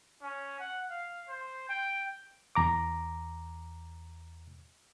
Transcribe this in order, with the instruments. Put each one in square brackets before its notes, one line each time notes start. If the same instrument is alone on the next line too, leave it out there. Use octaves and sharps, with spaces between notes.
[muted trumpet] C#4
F#5
F5
C5
G5
[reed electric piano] E2 A#5 D6